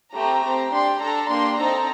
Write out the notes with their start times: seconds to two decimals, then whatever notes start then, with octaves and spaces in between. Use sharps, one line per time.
0.15 A3 C4 G4 A#5
0.44 C4 G4
0.73 D4 G4 C6
1.01 D4 A4 A#5
1.29 A#3 D4 G4 C6
1.58 C4 D#4 A4 A#5